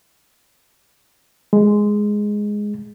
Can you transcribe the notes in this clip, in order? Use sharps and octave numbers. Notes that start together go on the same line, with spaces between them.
G#3